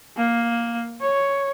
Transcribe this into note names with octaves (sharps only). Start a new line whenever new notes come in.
A#3
C#5